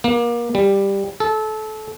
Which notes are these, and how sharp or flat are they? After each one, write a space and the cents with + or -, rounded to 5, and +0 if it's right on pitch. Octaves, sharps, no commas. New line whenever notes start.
A#3 +30
G3 +10
A4 -25